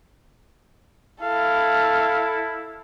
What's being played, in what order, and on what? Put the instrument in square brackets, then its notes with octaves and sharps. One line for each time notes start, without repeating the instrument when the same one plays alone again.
[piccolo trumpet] E4 [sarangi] A4 [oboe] F5